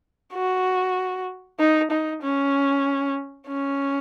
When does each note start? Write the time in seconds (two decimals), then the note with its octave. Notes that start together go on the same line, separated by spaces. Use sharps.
0.34 F#4
1.59 D#4
1.91 D#4
2.22 C#4
3.47 C#4